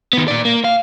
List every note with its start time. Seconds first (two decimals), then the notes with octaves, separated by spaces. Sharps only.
0.13 D#3 B3
0.28 A#2 D5
0.45 A#3
0.64 F5